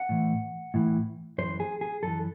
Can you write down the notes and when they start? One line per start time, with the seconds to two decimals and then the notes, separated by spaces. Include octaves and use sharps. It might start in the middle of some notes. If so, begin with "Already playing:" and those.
Already playing: F#5
0.09 A2 E3
0.74 A2 E3
1.38 F#2 E3 C5
1.60 G#4
1.81 G#4
2.03 F#2 E3 A4